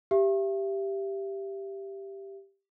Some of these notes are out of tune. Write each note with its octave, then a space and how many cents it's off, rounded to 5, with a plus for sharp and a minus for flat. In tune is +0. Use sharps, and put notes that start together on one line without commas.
G4 +0 E5 +30